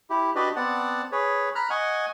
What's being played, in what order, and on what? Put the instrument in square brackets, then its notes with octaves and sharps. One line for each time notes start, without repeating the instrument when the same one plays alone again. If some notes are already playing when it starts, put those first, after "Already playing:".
[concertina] E4 G4
D4 F#4 G4 B4 D5 D#5
B3 C4 D5 F#5 A5
G#4 B4 C#5
A#5 B5 F6 F#6
D#5 F#5 G#5 C#6